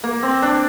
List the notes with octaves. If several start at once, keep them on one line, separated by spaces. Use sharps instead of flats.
A#3
C4
D4